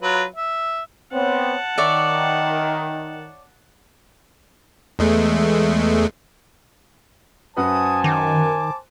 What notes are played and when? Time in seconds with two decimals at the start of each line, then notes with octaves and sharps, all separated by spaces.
0.02 F#3 F4 B4
0.36 E5
1.13 B3 C4 C#5 F#5 A5
1.78 D#3 C#5 D5 E5
4.99 E2 G#3 A3
7.57 F#2 F#4 B4 C5 G#5 A5 D#6
8.04 D#3 D6